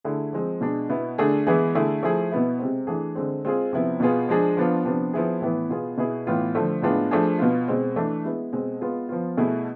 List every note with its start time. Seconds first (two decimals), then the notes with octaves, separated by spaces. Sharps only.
0.04 D3 A3 E4 G#4
0.33 F3 G#3 C4
0.61 B2 G#3 D4
0.89 B2 B3 E4
1.18 D3 A3 D4 G#4
1.47 E3 G#3 B3 E4 G#4
1.75 D3 A3 E4 G#4
2.03 F3 A3 E4 G#4
2.31 B2 B3 E4
2.59 C3 G#3 C4
2.87 E3 A3 D4 G#4
3.15 D3 G#3 C4
3.44 G#3 C4 F4 G#4
3.73 C3 F3 B3 E4
4.00 B2 B3 F4 G#4
4.29 F3 G#3 D4 G#4
4.57 F3 B3 D4 F4
4.85 C3 F3 B3 D4
5.14 F3 B3 E4 G#4
5.41 A2 E3 B3 E4
5.70 B2 B3 F4 G#4
5.98 B2 B3 E4 G#4
6.27 A2 E3 B3 F4
6.55 D3 F3 A3
6.82 A2 G#3 B3 D4 F4
7.11 F3 A3 D4 G#4
7.39 B2 B3 F4
7.68 B2 G#3 C4
7.96 E3 A3 D4
8.25 G#3 B3 E4
8.53 B2 G#3 C4
8.81 G#3 B3 F4
9.09 F3 B3 F4
9.37 B2 A3 E4 G#4